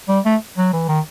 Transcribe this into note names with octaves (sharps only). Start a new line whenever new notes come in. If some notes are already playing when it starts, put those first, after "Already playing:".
G3
A3
F#3
E3
D#3